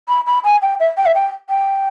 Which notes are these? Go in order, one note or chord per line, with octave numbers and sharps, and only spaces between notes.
B5
B5
G#5
G5
E5
G5
E5
G5
G5